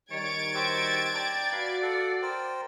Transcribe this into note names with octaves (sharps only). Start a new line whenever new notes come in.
D#3 G3 C#5 G#6 A6 D7
F#4 G4 C5 E6
D5 G5 A5 A#5
F#4 B4 F5
A4 F5 F#5
A#4 C5 G5